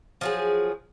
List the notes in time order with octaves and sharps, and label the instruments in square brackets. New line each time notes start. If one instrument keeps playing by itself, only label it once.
[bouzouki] F3 F#3 G#4